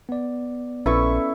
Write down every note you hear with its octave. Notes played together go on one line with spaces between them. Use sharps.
B3 D5
A#1 C#4 E4 A4 B4 C#6